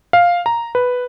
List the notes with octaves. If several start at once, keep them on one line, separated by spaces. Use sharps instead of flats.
F5
A#5
B4